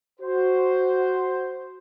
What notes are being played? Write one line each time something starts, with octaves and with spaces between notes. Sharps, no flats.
F#4 C5